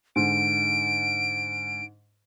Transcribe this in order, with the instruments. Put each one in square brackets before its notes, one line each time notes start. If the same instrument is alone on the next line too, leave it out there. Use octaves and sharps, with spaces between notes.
[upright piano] G#2 D3 [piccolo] D7